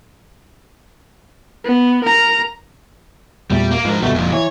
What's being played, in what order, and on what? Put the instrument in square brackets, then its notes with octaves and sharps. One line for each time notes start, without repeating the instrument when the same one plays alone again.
[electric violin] B3
A#4 A#5
[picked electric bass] E2 A#2 A3 [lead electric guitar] G3
[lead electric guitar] A#3
[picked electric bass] G#2 [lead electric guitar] F3 A#4
[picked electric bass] D2 G2 B2 [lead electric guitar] A3
[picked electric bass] F1 [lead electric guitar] F2 A#2
[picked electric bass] E3 [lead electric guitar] C#5